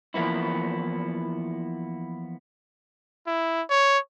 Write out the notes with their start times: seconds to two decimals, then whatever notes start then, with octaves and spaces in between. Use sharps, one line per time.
0.14 E3 F3 A#3 B3 E4
3.27 E4
3.70 C#5